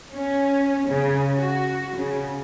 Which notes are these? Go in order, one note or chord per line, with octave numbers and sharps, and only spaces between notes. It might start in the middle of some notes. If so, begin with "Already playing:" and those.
C#4
C#3
F#4
C#3